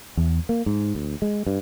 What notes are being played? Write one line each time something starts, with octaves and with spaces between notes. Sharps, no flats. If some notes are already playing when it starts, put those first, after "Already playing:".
E2
A#3
G#2
D2
G#3
G2